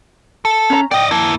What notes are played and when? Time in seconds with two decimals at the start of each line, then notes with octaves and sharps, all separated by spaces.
0.45 A4
0.70 C#4 A#5
0.91 D5 D#5 G5
1.11 A#3 E4 A5